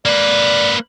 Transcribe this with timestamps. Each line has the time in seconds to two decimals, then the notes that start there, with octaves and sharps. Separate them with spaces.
0.05 A#3 B4 D5